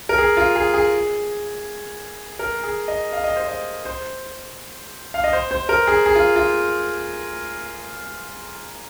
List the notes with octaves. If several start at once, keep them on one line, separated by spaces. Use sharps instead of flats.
A#4
G#4
F4
G#4
G#4
A#4
G#4
D#5
F5
D#5
C5
D#5
C5
F5
D#5
C5
C5
A#4
G#4
G#4
F4
F4